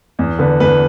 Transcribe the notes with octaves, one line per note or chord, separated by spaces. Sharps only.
E2
D3 B4
E2 B4